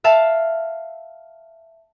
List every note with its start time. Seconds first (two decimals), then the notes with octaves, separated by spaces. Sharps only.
0.04 E5 F5 A5